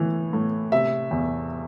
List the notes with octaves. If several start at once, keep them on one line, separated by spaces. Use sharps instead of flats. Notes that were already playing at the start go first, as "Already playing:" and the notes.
Already playing: A2 E3
A2
C3 E5
E2